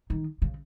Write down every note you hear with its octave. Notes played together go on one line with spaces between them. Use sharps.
D#3
C#3